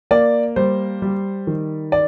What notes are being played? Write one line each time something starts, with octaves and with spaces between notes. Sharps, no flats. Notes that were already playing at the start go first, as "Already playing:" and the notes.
A#3 D5
G3 C5
G3
D#3
D5